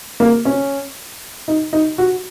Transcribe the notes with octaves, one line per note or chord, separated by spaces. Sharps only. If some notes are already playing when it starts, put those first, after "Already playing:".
A#3
C#4
D#4
D#4
F#4